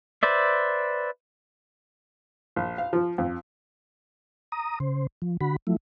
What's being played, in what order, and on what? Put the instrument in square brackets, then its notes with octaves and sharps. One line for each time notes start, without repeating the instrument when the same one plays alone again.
[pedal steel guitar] B4 C5 D5 E5
[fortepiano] A#1
F5
F3
F2
[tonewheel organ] A#5 D#6
C#3 C5
F3
D3 F#4 B5
F3 F#3 A3 E4